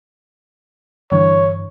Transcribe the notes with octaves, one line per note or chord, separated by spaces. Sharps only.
G2 D3 E3 C#5